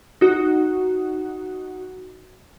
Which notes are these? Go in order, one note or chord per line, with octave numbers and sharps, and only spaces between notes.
D#4 F#4